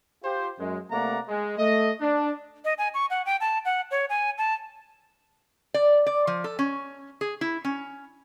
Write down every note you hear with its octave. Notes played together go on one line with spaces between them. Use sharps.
F4 G4 C5
F#2 G#3
C3 A3 A#3 D5 F#5 A#5
G#3
A3 D#5
D4
D#5
G#5
C#6
F#5
G5
A5
F#5
C#5
G#5
A5
D5
D5
F3
A4
C#4
G#4
E4
C#4